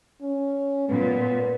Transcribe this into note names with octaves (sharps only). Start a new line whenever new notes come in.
C#4
A#2 B3